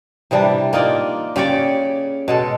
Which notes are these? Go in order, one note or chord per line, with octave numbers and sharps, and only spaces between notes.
C3 E3 G3 D4
A#3 D#4 F4 D5
C#3 G4 C#5 D5
B2 G#3 A4